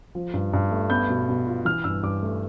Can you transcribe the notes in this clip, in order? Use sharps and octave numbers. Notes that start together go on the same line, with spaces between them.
F3
G2
G2
A3
B3 G6
B2
B2
F4
E3 F6
G2 E6
G2 D6
A3